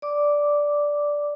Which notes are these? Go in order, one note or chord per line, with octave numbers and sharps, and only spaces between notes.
D5 D6